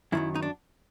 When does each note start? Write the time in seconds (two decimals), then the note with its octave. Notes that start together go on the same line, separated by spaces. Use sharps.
0.12 F#2 D#3 E3 F#3 E4
0.35 D#4
0.43 D4